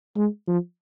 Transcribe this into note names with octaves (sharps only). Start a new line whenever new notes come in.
G#3
F3